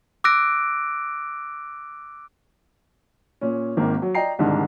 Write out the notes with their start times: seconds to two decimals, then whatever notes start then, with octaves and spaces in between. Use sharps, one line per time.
0.24 D6 E6 F#6 A#6 D7
3.41 A#2 C#4
3.77 G#1 D#3 A#3 C4
4.02 F#3
4.15 D5 D#5 G5 A#5 C7
4.39 C2 G#2 D3 D#3